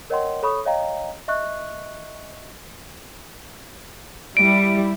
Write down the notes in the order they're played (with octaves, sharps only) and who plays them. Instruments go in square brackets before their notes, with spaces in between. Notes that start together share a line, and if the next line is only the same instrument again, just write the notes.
[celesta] A#4 C#5 D#5 F#5 G5 C6
A4 C#5 B5 C#6 D#6
C#5 D#5 F5 G5 A#5
D#5 E5 C#6 F#6
[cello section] G3 E4 [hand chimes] D7